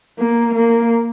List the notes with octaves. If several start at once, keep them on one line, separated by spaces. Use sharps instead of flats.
A#3
A#3